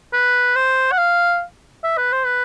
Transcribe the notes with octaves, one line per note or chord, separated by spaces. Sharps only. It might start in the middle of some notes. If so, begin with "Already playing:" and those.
B4
C5
F#5
F5
E5
B4
C5
B4